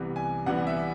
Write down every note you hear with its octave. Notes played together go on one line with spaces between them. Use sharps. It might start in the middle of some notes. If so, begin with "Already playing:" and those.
Already playing: C2 C3 E3 G3 B3
G#5
C2 C3 E3 G3 B3 F#5
E5